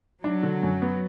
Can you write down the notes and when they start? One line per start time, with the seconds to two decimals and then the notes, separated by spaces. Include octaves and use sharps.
0.24 F#3 D4
0.43 D3
0.63 F#2
0.82 B3